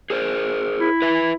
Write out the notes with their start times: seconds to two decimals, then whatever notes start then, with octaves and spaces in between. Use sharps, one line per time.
0.10 G#4 A#4 C5
0.80 E4
1.02 B4 E5